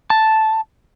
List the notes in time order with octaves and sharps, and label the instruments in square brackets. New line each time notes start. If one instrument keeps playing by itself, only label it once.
[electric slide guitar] A5